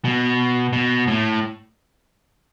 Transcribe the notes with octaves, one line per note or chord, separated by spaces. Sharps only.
B2
B2
A2